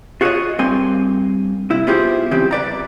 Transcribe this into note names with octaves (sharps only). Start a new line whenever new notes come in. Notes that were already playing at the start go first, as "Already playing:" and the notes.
F4 F#4 G#4 A4 C#5 D#5
G2 A#3 C4 G#5 C6
C3 E4
B3 E4 F4 G4 G#4 C5
C#3 E3 G3 C4 G4
B4 D5 A#5